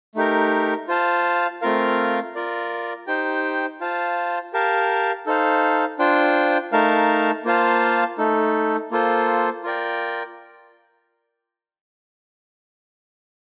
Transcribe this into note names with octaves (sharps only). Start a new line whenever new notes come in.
A3 D#4 G4 A#4
F4 C5 F5 A5
A3 C4 F4 A#4 F5
F4 A#4 D5
D#4 G4 C5 G5
F4 C5 F5 A5
G4 A#4 F5 A5
D#4 A4 C5 F5
D4 F4 C5 G5
A3 D#4 A#4 F5 A5
A#3 F4 C5 F5 A5
A3 D#4 A4
A#3 F4 A4 C5
F4 A#4 D5 G5